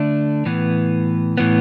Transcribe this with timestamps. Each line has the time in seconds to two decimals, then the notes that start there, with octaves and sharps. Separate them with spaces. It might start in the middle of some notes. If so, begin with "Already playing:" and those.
Already playing: D3 A3 D4
0.46 A2 E3 B3
1.38 A2 E3 B3